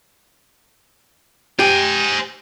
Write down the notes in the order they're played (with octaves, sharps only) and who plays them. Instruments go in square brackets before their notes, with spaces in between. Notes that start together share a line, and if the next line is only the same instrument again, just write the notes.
[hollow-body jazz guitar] G4 [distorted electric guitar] C5 G#5